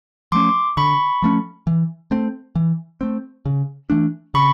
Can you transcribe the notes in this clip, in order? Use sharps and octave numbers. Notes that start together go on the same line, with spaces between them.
F3 A3 C#4 C6 D6
D3 B5 C#6
F3 A3 C#4
E3
A3 C4
E3
A3 C4
C#3
E3 A3 D4
C#3 B5 C#6